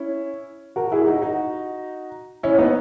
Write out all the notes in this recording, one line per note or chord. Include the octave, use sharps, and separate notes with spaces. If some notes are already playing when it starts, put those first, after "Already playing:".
Already playing: C#4 E4
F#4 A#4
E4 G#4
D#4 F#4
D#4 F#4
C#4 E4
B3 D#4